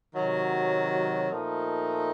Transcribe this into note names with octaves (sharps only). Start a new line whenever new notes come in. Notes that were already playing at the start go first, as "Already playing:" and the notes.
C3 D#3 F#3
A#2 F3 A3 D#4